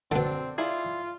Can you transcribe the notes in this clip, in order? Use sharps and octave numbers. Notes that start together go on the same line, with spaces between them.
B2 D3 C4 D4 A4
E4 F4 G#4 D5